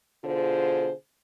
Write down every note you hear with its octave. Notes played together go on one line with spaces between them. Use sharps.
B2 D3 F4 G#4 C5